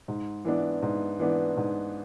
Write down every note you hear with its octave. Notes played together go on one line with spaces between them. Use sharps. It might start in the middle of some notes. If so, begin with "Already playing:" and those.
G#2
E3 B3 D4
G#2
E3 B3 D4
G#2